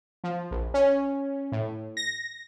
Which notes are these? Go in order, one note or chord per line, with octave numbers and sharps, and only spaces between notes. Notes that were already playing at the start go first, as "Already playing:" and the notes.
F3
A#1
C#4
A2
A#6